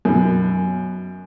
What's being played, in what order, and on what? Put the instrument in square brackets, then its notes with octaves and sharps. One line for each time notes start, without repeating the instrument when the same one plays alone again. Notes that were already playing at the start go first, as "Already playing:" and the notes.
[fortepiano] F#2 B2